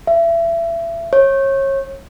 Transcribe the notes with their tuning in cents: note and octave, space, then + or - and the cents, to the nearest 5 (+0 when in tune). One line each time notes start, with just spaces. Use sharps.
E5 +30
C#5 -30